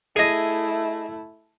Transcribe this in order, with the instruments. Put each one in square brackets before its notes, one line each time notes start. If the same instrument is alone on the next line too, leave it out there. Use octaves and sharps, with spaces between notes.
[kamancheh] A3 E4 [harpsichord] G#4 D#5